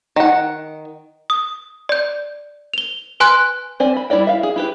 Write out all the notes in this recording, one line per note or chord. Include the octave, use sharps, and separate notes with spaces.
D#3 F#5
D#6
D5 G6
F7 G7
B4 G#5 C6 F#6
C4 C5 D5 G#5
B5
G3 E4 C5 D5 G5
E5 F5
G#4
E4 G4 B4